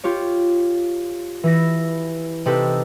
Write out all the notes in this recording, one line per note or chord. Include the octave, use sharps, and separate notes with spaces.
F4 G4 C#5
E3 E4 A#6
C3 C4 D#4 G4 A4 B4